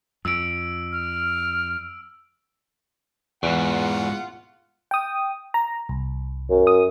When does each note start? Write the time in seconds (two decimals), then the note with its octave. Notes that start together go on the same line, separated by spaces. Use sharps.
0.25 F2 E6 D7
0.92 F6
3.43 E2 G#2 B2 F4 F#5
4.91 G5 D#6
5.54 A#5
5.89 C2
6.50 F#2
6.67 D#6